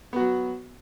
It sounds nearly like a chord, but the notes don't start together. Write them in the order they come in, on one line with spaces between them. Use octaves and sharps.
B3 F#4 F#3